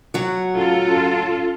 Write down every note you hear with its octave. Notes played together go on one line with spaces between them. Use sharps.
F#3 F#4
C#4 F4 A4